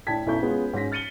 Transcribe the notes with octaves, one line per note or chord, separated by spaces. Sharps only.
A2 D4 G5 A5 G#6 B6
B1 F#2 E4 A4 C#6 G6
G#3 B3 C#4 F4
G#2 C#4 F#4 A#6 B6
F6 A6 C#7 D#7 F#7 G7